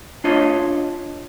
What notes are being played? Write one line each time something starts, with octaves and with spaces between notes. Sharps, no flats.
D4 F4 C#5 D#5